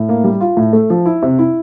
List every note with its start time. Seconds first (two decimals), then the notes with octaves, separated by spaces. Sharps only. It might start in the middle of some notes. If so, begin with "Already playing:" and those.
Already playing: A2
0.09 A#3
0.24 G3
0.41 F4
0.57 A2
0.73 A3
0.90 F3
1.06 E4
1.22 C3
1.39 E4